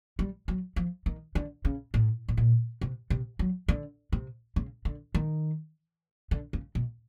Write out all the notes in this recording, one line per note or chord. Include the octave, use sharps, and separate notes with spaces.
G3
F#3
F3
D#3
D3
C#3
A2
A2
A#2
C3
C3
F#3
D3
C3
C#3
D3
D#3
D3
C#3
B2